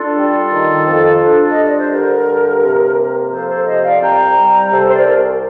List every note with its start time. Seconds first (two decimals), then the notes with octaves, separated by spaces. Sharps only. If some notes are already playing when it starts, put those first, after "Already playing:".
Already playing: D4 F4 A4
0.16 G3
0.51 D#3
0.86 F2
1.22 D4
1.50 D#5
1.57 G3
1.65 D5
1.79 C5
1.92 D3 G4 A#4
2.26 G2
2.62 C3
2.96 A#3
3.31 F3 A4 C5
3.49 A4 C5
3.66 C3 C5 D#5
3.84 D5 F5
4.01 C2 G5 A#5
4.36 G3
4.72 C3 A4 C5
4.89 C5
4.95 A#4 D5
5.07 C2